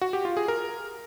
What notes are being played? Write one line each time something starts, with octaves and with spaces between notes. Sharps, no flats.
F#4
G4
F4
G#4
A#4